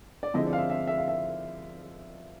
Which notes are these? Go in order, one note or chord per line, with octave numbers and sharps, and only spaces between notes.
D5
D3 F3 G#3 C4 E4 D#5
D5
F5
E5
E5
E5
F5
E5